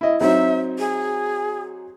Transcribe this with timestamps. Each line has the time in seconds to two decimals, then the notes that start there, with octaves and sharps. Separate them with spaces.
0.01 E4 D#5
0.21 F#3 C4 D#4 E5
0.79 G#4